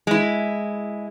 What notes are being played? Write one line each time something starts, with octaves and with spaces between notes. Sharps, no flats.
G#3 E4